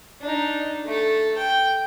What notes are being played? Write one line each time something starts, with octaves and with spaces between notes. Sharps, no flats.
D4 D#4
A3 A4
G5